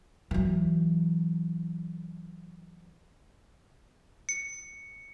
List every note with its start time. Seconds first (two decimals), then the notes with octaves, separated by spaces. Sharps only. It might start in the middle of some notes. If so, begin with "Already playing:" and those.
0.31 E3 F#3
4.29 C#7